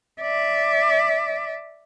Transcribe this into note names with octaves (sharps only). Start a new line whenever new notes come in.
D5 E5